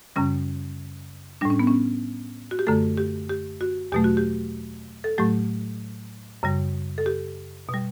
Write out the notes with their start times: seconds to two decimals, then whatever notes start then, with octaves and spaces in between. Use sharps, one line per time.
0.16 F#2 C#3 G3 C#4
1.41 A2 G3 D4
1.50 C#4
1.59 B3
1.67 C#4
2.51 F#4
2.59 G4
2.67 F#2 D3 A3 A4
2.98 G4
3.29 G4
3.61 F#4
3.92 E2 B2 F#3 A3 G4
4.04 F#4
4.17 G4
5.04 A4
5.18 A2 F#3 A3 G4
6.43 F#2 C#3 G3
6.98 A4
7.06 G4
7.69 B2
7.74 G3